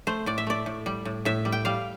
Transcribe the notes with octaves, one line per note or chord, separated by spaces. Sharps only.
A3 C5
A2 D5
E5
A3 D5
A2
G3
A2
A2 E5
G3
G5
G3 F5